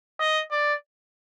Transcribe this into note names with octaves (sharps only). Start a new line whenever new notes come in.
D#5
D5